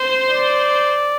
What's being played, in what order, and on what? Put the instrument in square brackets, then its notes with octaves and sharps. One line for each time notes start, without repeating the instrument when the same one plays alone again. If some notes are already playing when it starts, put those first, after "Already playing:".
Already playing: [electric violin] C5
[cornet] D5